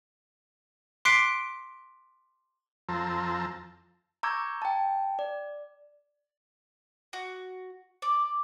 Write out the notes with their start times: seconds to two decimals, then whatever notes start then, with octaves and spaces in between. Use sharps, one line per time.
1.05 C6 D6 F#6 B6 C7 D7
2.89 F2 F3 A5 A#5 C6 E6
4.23 A#5 C#6 D6 E6 G6 G#6
4.62 G5 A5
5.19 D5
7.13 F#4
8.02 D5